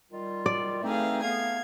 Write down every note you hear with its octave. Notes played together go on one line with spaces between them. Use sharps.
D#3 G3 F4
D5
E3 A3 C4 D#4 G#4 F5
A3 B3 F5 G#6